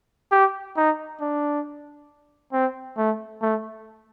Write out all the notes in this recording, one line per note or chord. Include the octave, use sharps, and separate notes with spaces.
G4
D#4
D4
C4
A3
A3